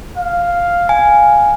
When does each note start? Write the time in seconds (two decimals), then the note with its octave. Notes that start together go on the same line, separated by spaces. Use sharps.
0.17 F5
0.89 F5 G#5